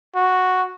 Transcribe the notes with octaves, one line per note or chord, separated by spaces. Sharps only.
F#4